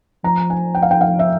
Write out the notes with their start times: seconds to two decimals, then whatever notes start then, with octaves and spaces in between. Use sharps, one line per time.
0.23 F3 A#5
0.50 G#5
0.75 G5
0.82 F5
0.91 G5
1.01 F5
1.19 E5